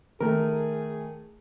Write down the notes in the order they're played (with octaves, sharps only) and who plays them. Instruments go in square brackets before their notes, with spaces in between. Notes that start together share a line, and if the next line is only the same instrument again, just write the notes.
[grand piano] D#3 A3 [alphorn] G#4 [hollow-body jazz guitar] A#4